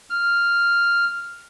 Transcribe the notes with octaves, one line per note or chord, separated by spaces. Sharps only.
F6